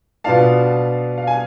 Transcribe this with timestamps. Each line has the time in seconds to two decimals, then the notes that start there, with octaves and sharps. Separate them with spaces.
0.24 B2 B3 D4 F4 F5 A5
1.18 F5
1.27 G#5